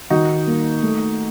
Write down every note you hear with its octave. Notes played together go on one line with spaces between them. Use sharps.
D#3 D#4 F#4
A#3
A3